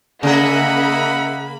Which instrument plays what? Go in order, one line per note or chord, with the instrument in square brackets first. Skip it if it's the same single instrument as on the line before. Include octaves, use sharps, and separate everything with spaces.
[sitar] C#3 G#4 [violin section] A#3 B5 [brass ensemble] D#5 E5 F#5